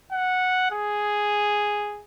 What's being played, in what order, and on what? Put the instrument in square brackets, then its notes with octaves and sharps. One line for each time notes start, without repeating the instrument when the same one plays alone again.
[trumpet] F#5
G#4